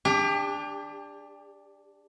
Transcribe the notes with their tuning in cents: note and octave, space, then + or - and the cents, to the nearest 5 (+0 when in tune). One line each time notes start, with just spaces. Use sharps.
D4 +0 G4 +35